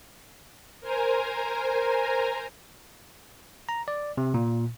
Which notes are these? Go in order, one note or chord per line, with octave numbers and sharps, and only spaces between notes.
A#4 C5 G#5 A#5
A#5
D5
C3
A#2